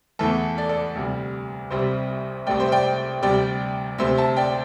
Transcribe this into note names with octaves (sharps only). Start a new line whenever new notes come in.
E2 E3 A3 A4
A4 D5
A4 D5
D2 C3 G3
C2 C3 G3 C5 E5
C2 C3 A3 D5 G5
C5 E5
D5 G5
D2 C3 G3 D5 G5
D2 C3 A3 C5 E5
E5 A5
D5 G5